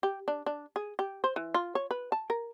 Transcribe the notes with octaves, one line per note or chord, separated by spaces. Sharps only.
G4
D4
D4
G#4
G4
C5
E3
F4
C#5
B4
A5
A#4